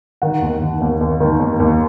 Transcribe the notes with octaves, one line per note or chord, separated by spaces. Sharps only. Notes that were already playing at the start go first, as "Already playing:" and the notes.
D#3 F#5
D#2
D#3
D#2
D#2
D#3
D#2
D#2